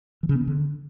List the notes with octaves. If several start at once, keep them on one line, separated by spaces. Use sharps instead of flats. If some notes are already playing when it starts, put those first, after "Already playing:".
E3
C#3
B3
C#3
D3